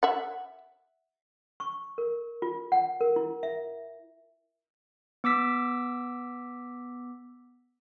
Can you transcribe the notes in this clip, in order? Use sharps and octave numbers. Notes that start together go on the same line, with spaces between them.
E5 F#5
C#6
A#4
F4
F#5
A#4
E4
E5
B3 D6 E6 B6